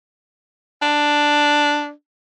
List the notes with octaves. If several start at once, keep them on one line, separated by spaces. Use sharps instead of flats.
D4